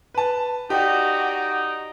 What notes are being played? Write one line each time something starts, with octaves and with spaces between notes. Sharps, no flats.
B4 A5
D#4 F#4 G4 D5